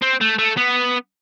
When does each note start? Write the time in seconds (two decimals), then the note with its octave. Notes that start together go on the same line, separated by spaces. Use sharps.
0.02 C4
0.21 A3
0.38 A3
0.57 B3